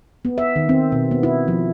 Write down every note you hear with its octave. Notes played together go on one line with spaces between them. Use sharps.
B3
E5
D#3
C4
B2
B3
E4
F3